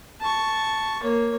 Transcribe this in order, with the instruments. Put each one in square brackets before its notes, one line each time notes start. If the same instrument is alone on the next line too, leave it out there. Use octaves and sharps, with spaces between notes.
[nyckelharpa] A5 C#6
A#3 C#5